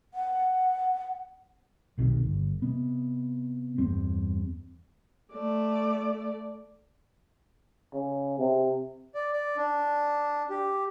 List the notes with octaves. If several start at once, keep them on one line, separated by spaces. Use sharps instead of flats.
F#5
F1 B1 C3 D#3
G1
C3 B3
E2 G2 G3 C4
A3 D5
C#3
C3
D5
D5
D4
G4